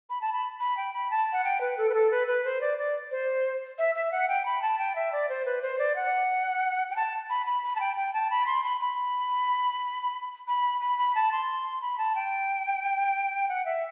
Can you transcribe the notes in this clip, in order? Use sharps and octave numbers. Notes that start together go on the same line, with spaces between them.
B5
A5
B5
B5
G5
B5
A5
F#5
G5
B4
A4
B4
A4
B4
B4
C5
D5
D5
C5
E5
E5
F#5
G5
B5
A5
G5
E5
D5
C5
B4
C5
D5
F#5
G5
A5
B5
B5
B5
A5
G5
G5
A5
B5
C6
B5
B5
B5
B5
B5
A5
C6
B5
A5
G5
F#5
E5